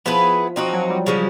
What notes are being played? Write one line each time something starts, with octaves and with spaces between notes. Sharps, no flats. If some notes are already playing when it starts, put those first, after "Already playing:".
F3 B3 E4 G#4 B4
F3 C4 D#4 F#4
F3
F#3
G3
C#3 F3 G#3 C#4